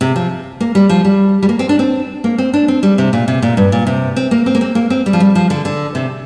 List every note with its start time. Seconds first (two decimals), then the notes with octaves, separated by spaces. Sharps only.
0.01 C3
0.16 F3
0.60 A#3
0.75 G3
0.89 F3
1.05 G3
1.43 G3
1.49 A#3
1.59 C4
1.69 D4
1.79 C4
2.24 A#3
2.38 C4
2.53 D4
2.68 C4
2.83 G3
2.98 C3
3.13 A#2
3.28 C3
3.42 A#2
3.57 G2
3.72 A#2
3.87 C3
4.16 C4
4.31 A#3
4.46 C4
4.55 A#3
4.61 C4
4.75 A#3
4.90 C4
5.06 G3
5.13 F3
5.20 G3
5.35 F3
5.50 D3
5.65 D3
5.95 C3